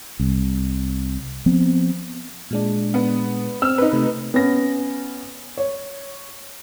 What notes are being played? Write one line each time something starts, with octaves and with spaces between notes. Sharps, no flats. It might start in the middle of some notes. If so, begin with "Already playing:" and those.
C2
F3 B3 C4
A#2 G#3 D4
B3
C4 E6 F6
D#4 B4
C3 A3
B3 C#4 A#6
C#5